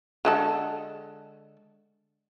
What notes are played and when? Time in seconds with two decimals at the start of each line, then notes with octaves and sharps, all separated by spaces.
0.25 D3 G#3 A4